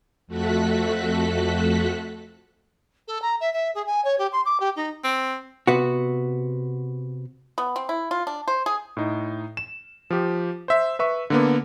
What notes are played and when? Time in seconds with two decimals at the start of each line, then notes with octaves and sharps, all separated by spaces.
0.27 F2 A3 F#4 A4 F#6 B6
3.07 A4
3.22 A#5
3.40 E5
3.53 E5
3.74 G#4
3.86 G#5
4.04 C#5
4.18 G4
4.32 C6
4.45 D6
4.60 G4
4.76 D#4
5.04 C4
5.67 C3 B3 F#4
7.58 B3
7.76 C4
7.89 E4
8.11 F4
8.27 D4
8.48 C5
8.66 G#4
8.97 A2 D#4
9.57 E7
10.10 F3 G4
10.68 C5 E5
10.99 B4 E5 C#6
11.30 D3 A#3 B3